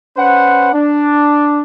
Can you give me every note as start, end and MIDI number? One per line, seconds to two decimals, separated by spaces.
0.17 0.71 61
0.17 0.71 71
0.17 0.71 72
0.17 0.71 78
0.73 1.63 62